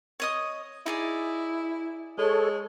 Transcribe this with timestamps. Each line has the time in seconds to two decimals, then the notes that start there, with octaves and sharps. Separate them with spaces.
0.20 C#5 D#5 D#6
0.86 D#4 E4 G#4 D5
2.18 G#3 A4 C#5